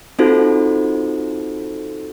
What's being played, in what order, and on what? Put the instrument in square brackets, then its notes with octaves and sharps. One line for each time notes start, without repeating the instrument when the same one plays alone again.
[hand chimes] C4 D#4 F4 F#4 A4 C5